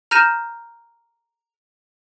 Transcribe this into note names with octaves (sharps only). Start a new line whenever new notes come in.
A#5 F6 G6 A#6 D#7 E7